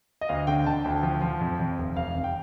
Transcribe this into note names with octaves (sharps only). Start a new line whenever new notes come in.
D#5
D2 F5
D3 G5
D3 A5
D2 G5
F3
F3
F2
F2
F1
F1 F5
F1
G5